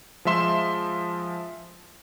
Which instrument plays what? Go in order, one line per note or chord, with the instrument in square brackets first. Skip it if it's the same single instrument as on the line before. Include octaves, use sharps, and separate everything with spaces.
[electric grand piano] F3 G#3 E5 C6 E7